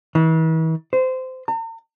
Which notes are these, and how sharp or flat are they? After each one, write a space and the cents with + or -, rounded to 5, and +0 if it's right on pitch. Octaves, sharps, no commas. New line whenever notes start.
E3 -40
C5 -20
A#5 -45